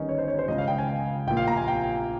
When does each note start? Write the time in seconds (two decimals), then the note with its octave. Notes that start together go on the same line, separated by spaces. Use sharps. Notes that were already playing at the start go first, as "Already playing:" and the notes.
Already playing: G1 G2 D#3 C#4 D#4
0.09 C#5
0.18 C5
0.28 C#5
0.39 C5
0.48 C#2 D#5
0.52 C#3
0.58 F5
0.68 G5
0.78 G#5
1.27 A#1 G5
1.30 A#2
1.37 F5
1.48 A#5
1.57 G#5
1.68 G5